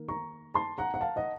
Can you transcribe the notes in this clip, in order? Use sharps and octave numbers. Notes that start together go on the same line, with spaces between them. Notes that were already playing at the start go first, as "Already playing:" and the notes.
Already playing: D#3 A#3
A#5 C#6
A5 C6
F#5 A#5
F#5
F5 A5
D#5 F#5